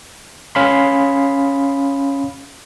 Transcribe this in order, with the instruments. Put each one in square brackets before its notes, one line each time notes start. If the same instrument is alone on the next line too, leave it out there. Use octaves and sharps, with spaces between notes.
[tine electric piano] C#4 F5 B5 C6